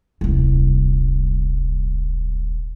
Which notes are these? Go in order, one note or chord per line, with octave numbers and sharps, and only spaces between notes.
D#1 C2